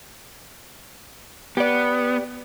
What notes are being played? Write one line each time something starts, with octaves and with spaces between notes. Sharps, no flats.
B3 G4 D5